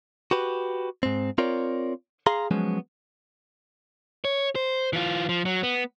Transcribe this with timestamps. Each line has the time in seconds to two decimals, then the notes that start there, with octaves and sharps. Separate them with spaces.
0.31 F#4 G4 B4
1.03 G#2 C4
1.38 C4 F4 A#4 C#5 D5
2.26 G#4 F5 A#5 C6
2.51 F3 F#3 G#3 B3 C#4
4.25 C#5
4.55 C5
4.93 E3 F4
5.29 F3
5.45 F#3
5.63 B3